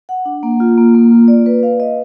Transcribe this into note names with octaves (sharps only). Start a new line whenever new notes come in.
F#5
D4
A#3
F4
A#3
A#3
F4
D5
B4
F5
D#5